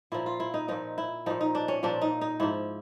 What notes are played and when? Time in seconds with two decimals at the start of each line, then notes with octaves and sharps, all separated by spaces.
0.12 A#2 F3 E4
0.26 F4
0.40 E4
0.54 D#4
0.68 A#2 F3 D#4
0.98 E4
1.26 A#2 F3 D#4
1.41 D#4
1.55 D4
1.68 C#4
1.83 A#2 F3 D4
2.02 D#4
2.21 D#4
2.40 G#2 F3 E4